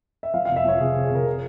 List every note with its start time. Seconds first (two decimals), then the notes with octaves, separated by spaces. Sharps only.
0.23 E5
0.34 F3 F5
0.45 F5
0.49 F1
0.56 E5
0.65 F3 C#5
0.80 C3 G#4
0.96 C3
1.04 G#4
1.11 C3 A#4
1.26 C#5